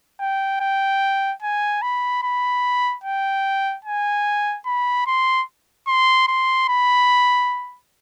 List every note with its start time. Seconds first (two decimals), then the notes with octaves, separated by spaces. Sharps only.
0.20 G5
0.60 G5
1.42 G#5
1.82 B5
2.23 B5
3.03 G5
3.85 G#5
4.66 B5
5.06 C6
5.87 C6
6.28 C6
6.69 B5